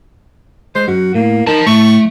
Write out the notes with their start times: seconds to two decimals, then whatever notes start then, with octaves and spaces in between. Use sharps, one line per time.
0.75 G#3 C5
0.88 F#2 F#4
1.14 A2 A#3
1.47 D#4 A#4 C5 A5
1.67 A2 A3 C#6